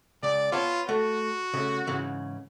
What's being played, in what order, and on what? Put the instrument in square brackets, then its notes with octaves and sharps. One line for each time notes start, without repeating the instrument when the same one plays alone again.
[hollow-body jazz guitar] C#2 [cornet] D5
[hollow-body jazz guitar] B3 C#5 A5 [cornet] F4
[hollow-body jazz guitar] A3 [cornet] F#4
[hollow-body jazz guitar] C#3 A3
G#2 C#3 E3